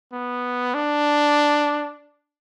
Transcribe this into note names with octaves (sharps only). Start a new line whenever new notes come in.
B3
D4